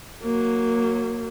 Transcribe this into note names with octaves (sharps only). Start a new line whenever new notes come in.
F#3 A#3